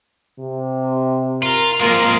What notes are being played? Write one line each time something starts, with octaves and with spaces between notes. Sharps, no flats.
C3
F4 A#4
F3 G#3 A#3 C4 F4 A#4